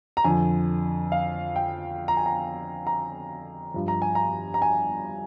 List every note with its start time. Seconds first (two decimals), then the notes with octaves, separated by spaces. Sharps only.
0.17 A#5
0.24 F2 D3 F3 G#5
1.12 F5
1.56 G5
2.08 A#5
2.17 G#5
2.26 A#5
2.87 A#5
3.74 G2 F3
3.88 A#5
4.02 G#5
4.15 A#5
4.54 A#5
4.62 G#5